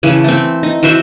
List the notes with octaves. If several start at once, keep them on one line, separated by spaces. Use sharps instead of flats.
C#3 E3 A3
A3 C4
D#4
E3 F#4 C5 E5